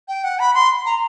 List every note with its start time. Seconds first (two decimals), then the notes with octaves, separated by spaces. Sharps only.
0.08 G5
0.24 F#5
0.39 B5
0.54 C6
0.85 A#5